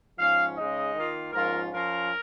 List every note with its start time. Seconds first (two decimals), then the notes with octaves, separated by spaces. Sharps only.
0.18 G#2 F3 C#4 F5
0.57 C#3 G#3 D#4 D#5
0.95 D#3 A#3 F4
1.33 G#2 F3 C#4 F4 A#4
1.72 F3 C#4 F4 A#4